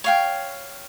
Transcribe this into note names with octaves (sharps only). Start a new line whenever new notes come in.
C#5 F5 G5